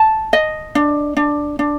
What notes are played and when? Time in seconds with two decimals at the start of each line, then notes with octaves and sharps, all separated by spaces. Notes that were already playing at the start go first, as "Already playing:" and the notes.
Already playing: A5
0.33 D#5
0.75 D4
1.17 D4
1.59 D4